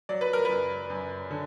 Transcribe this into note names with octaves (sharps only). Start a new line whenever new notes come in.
F#3 D5
B4
A#4
F#2 B4
F#2
D3